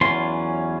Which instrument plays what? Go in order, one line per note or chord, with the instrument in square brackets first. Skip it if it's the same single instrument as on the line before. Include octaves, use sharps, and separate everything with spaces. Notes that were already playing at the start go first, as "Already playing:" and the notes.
[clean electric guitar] E2 E3 F#3 C#4 F4 C6